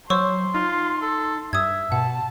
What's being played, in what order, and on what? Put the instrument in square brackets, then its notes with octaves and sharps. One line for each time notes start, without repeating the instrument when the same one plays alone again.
[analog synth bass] F#3 [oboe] C5 [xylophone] C#5 C#6 E6 [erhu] C6
[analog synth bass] D#4 [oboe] F4
[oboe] A4
[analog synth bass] G2 [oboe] E5 [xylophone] D#6 G#6
[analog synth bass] B2 [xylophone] F#5 [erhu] A5